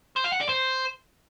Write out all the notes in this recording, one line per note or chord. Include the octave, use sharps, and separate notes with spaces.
C5
F5
F#5
D5
C5